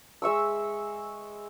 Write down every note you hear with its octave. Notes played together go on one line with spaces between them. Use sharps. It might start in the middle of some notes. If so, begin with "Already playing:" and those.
G#3 E5 C#6 E6